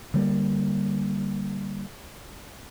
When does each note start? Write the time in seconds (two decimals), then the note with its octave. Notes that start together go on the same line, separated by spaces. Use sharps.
0.14 D3 G3 A#3